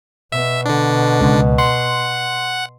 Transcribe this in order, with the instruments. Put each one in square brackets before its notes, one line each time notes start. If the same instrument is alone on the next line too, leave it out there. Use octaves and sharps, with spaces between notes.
[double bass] B2 [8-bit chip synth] E5
[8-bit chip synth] D3 D4
[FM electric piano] C#2
[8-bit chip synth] F#5 [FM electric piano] C6